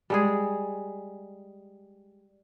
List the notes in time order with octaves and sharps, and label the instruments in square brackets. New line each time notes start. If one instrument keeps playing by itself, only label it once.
[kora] G3 G#3 G#4